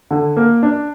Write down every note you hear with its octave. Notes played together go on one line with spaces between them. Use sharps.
D3
A#3
D4